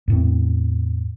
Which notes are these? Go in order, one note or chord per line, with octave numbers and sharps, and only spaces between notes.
E2 A2 C4